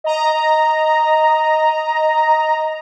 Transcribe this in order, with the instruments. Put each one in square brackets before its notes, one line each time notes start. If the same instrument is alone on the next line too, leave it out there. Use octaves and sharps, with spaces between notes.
[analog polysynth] D#5 A#5